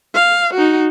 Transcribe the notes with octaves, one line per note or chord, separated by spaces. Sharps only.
F5
D#4 F#4